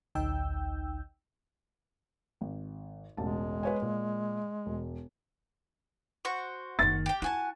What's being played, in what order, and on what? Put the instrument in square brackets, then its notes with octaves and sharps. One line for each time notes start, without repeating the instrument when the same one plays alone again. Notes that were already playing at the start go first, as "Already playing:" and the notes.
[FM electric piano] A1 D2 D#4 G5 E6 G6
[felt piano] G#1
[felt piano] E1 A1 A5 [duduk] G#3
[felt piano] B4 C#5 G#5
A#2
E1
[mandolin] F#4 C5 C#6
[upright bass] F#1 D#3 [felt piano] A6
[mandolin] G4 G5
[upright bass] E4 [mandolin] F#4 G#5 A5